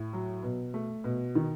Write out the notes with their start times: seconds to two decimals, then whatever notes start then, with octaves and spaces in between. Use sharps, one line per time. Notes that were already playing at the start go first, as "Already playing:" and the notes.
Already playing: A2
0.13 F#3
0.43 B2
0.74 A3
1.04 B2
1.35 D#3